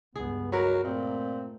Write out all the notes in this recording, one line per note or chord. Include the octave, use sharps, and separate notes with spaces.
C#2 G2 B3 G#4
F#3 F#4 A#4 B4
A#2 A3 C4